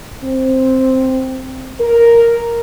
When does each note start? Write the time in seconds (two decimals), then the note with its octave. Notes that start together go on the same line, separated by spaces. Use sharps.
0.24 C4
1.81 A#4